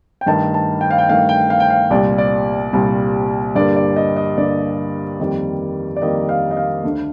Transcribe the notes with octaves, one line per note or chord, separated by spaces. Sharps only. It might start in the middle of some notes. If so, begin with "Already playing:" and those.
G5
G2 D#3 A3 A5
A5
G5
F5
G5
G2 D#3 A3 F5
G5
F5
G5
F5
C2 A#2 G3 D5
D5
C2 A#2 G3
G2 D3 G3 A#3 D5
D5
D#5
D#5
G2 D3 G3 A#3 D5
F2 D#3 G3 A#3
D5
F2 D#3 G3 A#3 D#5
F5
D#5
F5
D2 D3 A3